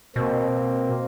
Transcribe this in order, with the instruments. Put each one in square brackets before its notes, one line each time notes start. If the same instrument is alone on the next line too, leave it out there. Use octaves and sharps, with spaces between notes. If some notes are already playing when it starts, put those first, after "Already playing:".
[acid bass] B2 [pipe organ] A#3 C4